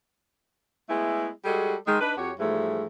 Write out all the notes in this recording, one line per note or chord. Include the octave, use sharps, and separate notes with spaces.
G#3 A3 B3 E4
G3 G#3 F#4 G#4 A4
D#3 G#3
D4 D#4 B4
F2 F#4 G4 C#5
G#2 E3 F3 G3 A3